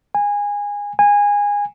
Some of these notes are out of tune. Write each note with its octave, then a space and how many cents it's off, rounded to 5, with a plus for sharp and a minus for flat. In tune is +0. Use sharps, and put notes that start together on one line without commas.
G#5 -20
G#5 -20